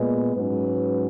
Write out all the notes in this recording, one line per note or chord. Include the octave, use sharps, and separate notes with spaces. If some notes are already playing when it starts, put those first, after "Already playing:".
Already playing: A#2 G#3 B3
G#2 F#3 C#4 B4